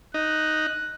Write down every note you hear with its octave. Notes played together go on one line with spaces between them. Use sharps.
D#4 F#6